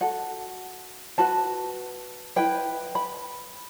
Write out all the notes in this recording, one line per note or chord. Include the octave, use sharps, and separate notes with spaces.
F#4 A4 F#5
F#4 B4 A5
E4 B4 G5
B5